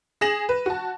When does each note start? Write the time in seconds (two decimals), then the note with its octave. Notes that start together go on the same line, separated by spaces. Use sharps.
0.21 G#4 A#6 E7 F#7
0.49 B4
0.66 F#4 A5